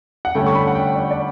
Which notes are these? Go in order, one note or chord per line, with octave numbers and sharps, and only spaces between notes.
F#5
G2 D3 A3 C#4 G5
C#6
B5
F#5
G5
D5
D5